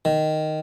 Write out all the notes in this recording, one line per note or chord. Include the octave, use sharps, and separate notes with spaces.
D#3